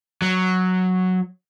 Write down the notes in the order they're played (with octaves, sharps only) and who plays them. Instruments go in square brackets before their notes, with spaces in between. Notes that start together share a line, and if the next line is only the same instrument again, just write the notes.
[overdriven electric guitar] F#3